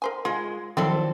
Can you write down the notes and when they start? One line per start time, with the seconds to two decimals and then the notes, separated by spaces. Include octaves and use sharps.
0.02 A#4 C5 G#5
0.25 G#3 F4
0.77 D#3 F3 F#3 C4 E4 A4 D5 G5